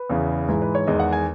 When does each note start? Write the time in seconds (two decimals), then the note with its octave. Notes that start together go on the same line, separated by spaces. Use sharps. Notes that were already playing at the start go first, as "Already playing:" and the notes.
Already playing: B4
0.10 E2 C#3 E3
0.49 G#2 E3 G#3
0.62 B4
0.75 C#5
0.87 E2 D#3 G#3 D#5
1.00 F#5
1.13 G#5